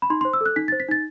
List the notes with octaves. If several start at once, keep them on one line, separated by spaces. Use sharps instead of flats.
B5
D#4 C6
C6
C5
E6
A4 F#6
D#4 B6
A6
C5
B6
D#4 A6